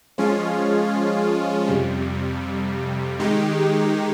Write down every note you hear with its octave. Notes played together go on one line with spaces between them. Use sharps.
F3 G#3 C#4 F4
F2 C3 G3
D#3 G#3 D#4 G4